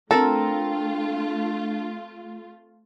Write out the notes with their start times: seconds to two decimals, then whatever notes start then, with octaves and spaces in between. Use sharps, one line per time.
0.11 A3 C4 D4 F4 A4 A#4